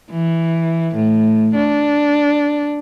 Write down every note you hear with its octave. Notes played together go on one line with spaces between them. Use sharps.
E3
A2
D4